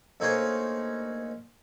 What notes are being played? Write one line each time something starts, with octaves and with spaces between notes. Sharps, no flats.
D2 A#3 D#4 G#4 C5 C#5